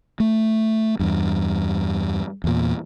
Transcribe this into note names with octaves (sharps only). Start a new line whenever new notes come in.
A3
E2 G2
E2 A#2